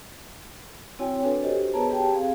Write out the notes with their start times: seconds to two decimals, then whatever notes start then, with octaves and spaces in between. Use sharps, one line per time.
0.99 C4 E4 F#4 C#5 G5 G#5
1.23 D4 F#4 A4 B4 C#5
1.43 F#4 G4 A4 C5 D#5
1.74 B3 G#4 B4 C#5 A5 A#5
1.91 G4 G5 A5
2.13 C4 G#4 F5